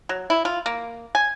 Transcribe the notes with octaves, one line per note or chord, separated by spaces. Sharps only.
F#3
E4
F4
A#3
G#5